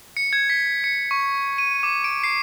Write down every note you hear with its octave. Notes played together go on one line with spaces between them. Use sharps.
C#7
G#6
B6
C#7
C#6
D#7
D6
D7
C7